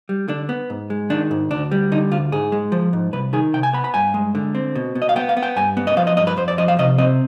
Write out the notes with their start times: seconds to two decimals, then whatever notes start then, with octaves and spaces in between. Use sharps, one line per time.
0.09 G3
0.28 D3 D4
0.49 B3
0.70 G#2
0.90 G#3
1.10 D#3 D4
1.31 G#2
1.51 D2 D4
1.71 G3
1.92 D3 D#4
2.11 D2 F4
2.32 G#2 G#4
2.52 G#3
2.72 F3
2.93 G#2
3.13 C2 B4
3.33 D#3 G#4
3.54 C3 G5
3.63 G#5
3.73 B3 B5
3.84 B5
3.94 G2 G#5
4.14 G#3
4.35 D3
4.55 C4
4.75 B2
4.95 B2
5.02 D#5
5.09 F5
5.16 B3 G5
5.29 F5
5.37 B3
5.43 G5
5.56 G2 G#5
5.77 B3
5.87 D#5
5.97 F3 F5
6.07 D#5
6.17 G2 D#5
6.27 B4
6.37 F2 C5
6.48 D5
6.58 F3 D#5
6.68 F5
6.79 C3 D#5
6.98 C4 D#5